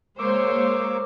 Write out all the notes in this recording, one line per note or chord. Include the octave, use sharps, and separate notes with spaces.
G#3 A#3 C5 C#5 C#6 D6 E6